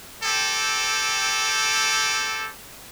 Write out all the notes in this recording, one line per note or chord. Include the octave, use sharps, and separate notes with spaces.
C4 G4 A4